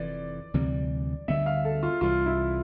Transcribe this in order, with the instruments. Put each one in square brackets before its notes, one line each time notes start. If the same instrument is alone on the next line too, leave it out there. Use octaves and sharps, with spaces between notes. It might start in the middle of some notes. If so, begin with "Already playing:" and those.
Already playing: [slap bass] F1 F2 E3 [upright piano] D5
[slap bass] D2 C3 E3 G3
[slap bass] D2 D3 G3 B3 [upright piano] E5
[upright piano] F5
A4
F4
[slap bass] C2 C3 E3 G3 [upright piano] F4
[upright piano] E4